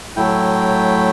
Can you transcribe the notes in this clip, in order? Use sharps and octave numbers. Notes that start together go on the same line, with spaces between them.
A2 F#3 A3 E4 G5